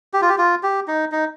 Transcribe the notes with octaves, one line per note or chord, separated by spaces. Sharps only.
G4
F4
G4
F4
G4
D#4
D#4